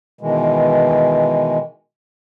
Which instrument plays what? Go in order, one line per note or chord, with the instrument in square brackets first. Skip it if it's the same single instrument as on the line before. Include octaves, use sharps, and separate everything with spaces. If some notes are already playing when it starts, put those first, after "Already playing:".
[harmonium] B2 D#3 E3 G#3